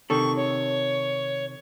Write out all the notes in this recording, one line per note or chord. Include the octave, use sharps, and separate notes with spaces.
C3 D#3 A4 C#6
C#5